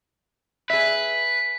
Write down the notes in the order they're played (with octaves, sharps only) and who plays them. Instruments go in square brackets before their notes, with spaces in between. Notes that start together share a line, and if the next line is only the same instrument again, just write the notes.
[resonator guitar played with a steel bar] G#4 E5 [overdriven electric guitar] B4 [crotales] B6